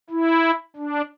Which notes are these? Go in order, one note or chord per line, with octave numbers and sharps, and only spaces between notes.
E4
D4